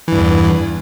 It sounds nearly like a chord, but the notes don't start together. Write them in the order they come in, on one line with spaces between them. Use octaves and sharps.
E3 G2 E2